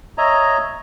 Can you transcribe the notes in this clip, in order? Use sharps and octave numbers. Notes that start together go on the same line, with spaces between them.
C#5 D#5 E5 A#5